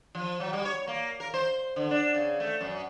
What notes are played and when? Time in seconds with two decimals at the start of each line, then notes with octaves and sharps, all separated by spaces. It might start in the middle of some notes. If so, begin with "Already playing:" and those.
0.15 F3
0.40 F#3
0.53 G3
0.65 C#5
0.87 A#3
1.20 A#4
1.34 C5
1.76 D3
1.91 D4
2.14 C#3
2.40 A3
2.61 F#2